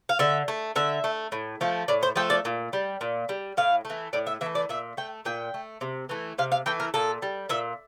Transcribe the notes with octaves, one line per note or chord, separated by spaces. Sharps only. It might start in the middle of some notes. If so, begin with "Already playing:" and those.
F5
D3 E5
A3
D3 E5
A3
A2
F3 A3
A2 D5
C5
F3 A3 G5
D5
A#2
G3
A#2
G3
A2 F5
E3 A3
A2 D5
E5
E3 A3 E5
D5
A#2 E5
A3 G5
A#2 G5
A3
C3
E3 A3
C3 F5
F5
E3 A3 G5
A#4
A#2 A4
G3
A#2 E5